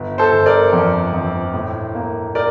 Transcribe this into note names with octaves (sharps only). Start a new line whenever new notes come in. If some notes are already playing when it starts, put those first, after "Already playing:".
Already playing: G1
A4 C5
G1
A#4 D5
F2
F2
A2
A#3
A#4 D5